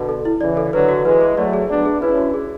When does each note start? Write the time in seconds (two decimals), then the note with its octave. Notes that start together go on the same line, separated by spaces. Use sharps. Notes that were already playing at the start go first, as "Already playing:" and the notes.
Already playing: B2 D3
0.09 A4
0.25 E4
0.40 C#3 E3 D5
0.57 A4
0.73 D3 F#3 B4
0.89 F#4
1.05 E3 G#3 B4
1.21 G#4
1.37 F#3 A3 D5
1.53 G#4
1.69 B3 D4 D5
1.86 G#4
2.01 C#4 E4 B4
2.18 F#4
2.34 G#4